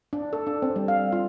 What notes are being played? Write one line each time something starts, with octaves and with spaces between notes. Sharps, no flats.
D4
A4
D4
C4
G3
F5
F4